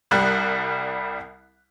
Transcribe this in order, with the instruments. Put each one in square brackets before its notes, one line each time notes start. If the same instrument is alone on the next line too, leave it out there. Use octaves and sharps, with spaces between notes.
[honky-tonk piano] C2 G3 F#6